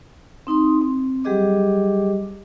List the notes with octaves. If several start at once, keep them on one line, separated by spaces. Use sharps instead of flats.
C4 D#4 C6 D#6
C4
F#3 G3 G4 G#4 D#5 D6